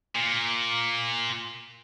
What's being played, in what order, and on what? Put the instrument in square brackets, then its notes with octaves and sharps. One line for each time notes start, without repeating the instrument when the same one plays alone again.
[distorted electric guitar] A#2